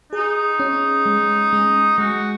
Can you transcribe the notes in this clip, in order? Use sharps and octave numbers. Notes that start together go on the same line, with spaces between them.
D#4 G#4
C#4
G#3
G#3
G#3 F#4